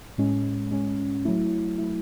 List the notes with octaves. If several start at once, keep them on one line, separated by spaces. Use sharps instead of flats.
A2 G#3 C#4
A2 G#3 C#4
F#3 A3 E4
F#3 A3 E4